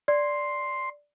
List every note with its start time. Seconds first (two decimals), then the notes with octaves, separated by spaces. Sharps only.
0.08 D5 C6